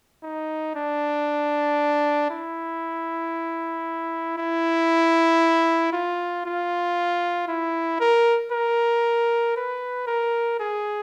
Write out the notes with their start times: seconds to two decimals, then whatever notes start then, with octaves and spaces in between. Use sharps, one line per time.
0.23 D#4
0.75 D4
2.30 E4
4.38 E4
5.93 F4
6.45 F4
7.48 E4
8.00 A#4
8.52 A#4
9.56 B4
10.07 A#4
10.60 G#4